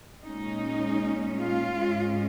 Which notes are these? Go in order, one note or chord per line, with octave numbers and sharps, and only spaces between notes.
A#2 G#3 C#4 D#4
F4
G#2 G#3 C#4